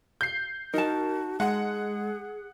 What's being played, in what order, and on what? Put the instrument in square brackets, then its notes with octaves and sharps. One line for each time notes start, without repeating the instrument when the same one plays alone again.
[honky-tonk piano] G6 C7
[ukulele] D#4 A5 [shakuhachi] F#4 [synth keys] A#4
[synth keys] G#3 [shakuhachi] G#4 [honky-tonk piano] F#5